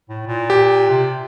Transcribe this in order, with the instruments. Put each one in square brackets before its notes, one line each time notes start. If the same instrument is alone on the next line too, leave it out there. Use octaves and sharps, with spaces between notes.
[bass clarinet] A2
A#2
[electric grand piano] G4
[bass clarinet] C3